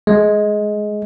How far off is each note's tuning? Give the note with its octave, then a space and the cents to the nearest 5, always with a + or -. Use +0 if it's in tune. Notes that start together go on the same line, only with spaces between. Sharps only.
G#3 +15